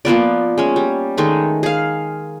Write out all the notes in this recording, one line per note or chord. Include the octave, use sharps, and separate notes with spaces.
F3 A#3 B3 D5
G#3 C#4
G3
D#3 G#3 A3
G#4 F5